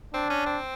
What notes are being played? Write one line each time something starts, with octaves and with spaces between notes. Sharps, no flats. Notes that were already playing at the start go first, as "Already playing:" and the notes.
C4 D4
C#4
C4